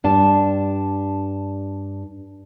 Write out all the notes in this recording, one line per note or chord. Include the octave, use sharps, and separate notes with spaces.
G2 D4 A5